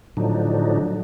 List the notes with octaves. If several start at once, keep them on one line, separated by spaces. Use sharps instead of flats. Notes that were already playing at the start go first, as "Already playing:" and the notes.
A2 D3 F3 F#3 D4 D#4